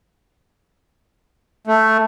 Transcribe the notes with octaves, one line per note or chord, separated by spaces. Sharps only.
A3